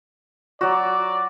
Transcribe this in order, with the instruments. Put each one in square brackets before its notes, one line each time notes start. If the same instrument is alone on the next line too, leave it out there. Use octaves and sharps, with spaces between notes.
[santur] F#3 F#4 [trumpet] D5